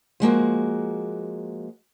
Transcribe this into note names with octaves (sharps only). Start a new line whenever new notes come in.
F3 G#3 A#3 F#4